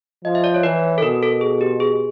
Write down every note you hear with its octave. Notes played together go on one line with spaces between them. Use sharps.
F3 D#5
E5
D5
C#5
E3 B4
A4
B2 A#4
A4
G#4
G4
G#4